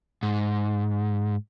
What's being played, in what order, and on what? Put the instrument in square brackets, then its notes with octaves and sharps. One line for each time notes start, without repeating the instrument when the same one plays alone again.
[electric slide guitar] G#2